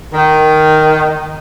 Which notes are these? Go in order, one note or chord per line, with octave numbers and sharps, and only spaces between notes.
D#3